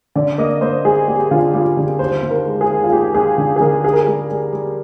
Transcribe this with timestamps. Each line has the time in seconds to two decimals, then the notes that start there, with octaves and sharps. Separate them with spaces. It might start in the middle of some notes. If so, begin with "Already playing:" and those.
0.15 D3 D5
0.38 A#3 D#5
0.61 A#3 C5
0.84 G3 G#4
1.08 A#3 G4
1.31 D3 F4
1.54 G3 F4
1.77 D3 G4
1.99 D#2 C5
2.23 D#2
2.30 A#4
2.45 G#3
2.61 G#4
2.69 D#2
2.84 F4
2.92 D#2 G4
3.14 D#2 G#4
3.38 D3
3.56 G#4
3.61 D3 A#4
3.84 G4 G#4
3.93 A#4
4.01 G#4
4.07 G3
4.31 G3
4.53 G3